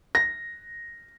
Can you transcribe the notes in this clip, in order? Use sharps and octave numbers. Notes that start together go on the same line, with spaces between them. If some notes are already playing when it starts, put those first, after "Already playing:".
A#6